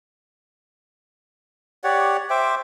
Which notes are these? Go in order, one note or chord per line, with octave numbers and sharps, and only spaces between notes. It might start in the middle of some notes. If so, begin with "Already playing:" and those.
G4 C#5 D5 F#5
C5 E5 G5 D6